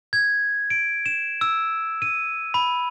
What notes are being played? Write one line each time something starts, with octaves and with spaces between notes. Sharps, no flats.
G#6
D7
E7
E6
D#7
B5